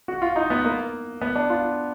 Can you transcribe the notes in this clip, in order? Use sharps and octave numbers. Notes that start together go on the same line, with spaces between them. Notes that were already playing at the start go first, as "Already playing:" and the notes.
F#4
F4
D#4
B3
A#3
B3
D4
F4